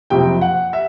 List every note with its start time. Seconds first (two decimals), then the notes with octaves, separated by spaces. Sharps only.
0.10 F#1 F2 C3 G5
0.41 F#5
0.73 E5